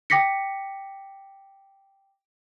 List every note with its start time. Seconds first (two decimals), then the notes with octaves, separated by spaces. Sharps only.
0.10 G5 D6 A#6 B6 C#7